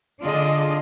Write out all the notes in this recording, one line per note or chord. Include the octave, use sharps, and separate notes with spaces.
D3 D4 F4 G#4 D5 D#5